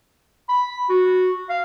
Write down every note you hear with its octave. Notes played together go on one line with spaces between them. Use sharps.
B5
F#4
F5